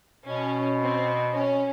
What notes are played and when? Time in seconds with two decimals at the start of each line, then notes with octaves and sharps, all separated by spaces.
0.26 B2 C#4
0.80 C4
1.33 C#4